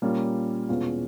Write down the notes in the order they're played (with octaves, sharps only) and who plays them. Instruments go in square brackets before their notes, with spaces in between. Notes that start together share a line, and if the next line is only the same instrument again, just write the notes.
[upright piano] A#2 G3 A#3 C#4 F4
E2 B2 G#3 C#4 F4